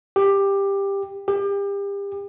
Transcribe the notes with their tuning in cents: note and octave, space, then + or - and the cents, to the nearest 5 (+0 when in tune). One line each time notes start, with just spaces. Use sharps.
G4 +15
G4 +35